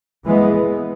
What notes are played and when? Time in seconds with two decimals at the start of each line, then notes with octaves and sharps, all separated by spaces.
0.25 E3 G#3 B3